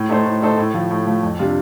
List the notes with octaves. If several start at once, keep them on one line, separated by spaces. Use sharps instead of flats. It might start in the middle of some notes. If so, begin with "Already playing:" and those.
Already playing: A2
A3 D#4 A4 C5
A2
A3 D#4 A4 C5
A2
F3 A3
A2
F3 A3
F2
C3 G3 D4 F4